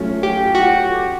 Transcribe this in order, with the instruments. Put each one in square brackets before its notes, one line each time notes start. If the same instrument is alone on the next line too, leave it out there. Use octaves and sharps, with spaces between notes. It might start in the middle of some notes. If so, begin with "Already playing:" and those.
Already playing: [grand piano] F#3 A3 C#4 F4
[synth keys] G4
F#4